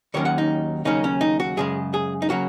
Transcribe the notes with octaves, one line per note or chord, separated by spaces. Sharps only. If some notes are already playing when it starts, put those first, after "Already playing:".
D#2 D#3 F#3 A#3 C#4 C#5
F#5
D#4
D#2 C#3 F#3 A#3 C#4 D#4
C#4
D#4
F#4
F#2 C#3 G#3 G#4
G#4
D#4
C#3 F#3 A#3 F#4